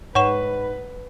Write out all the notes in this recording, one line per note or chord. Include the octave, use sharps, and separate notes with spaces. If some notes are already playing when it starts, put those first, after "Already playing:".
G#2 B4 C#5 F#5 C#6 E7